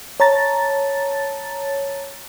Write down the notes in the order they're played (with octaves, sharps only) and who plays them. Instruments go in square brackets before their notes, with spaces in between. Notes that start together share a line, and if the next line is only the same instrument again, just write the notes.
[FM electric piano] C#5 A5 A#5 A6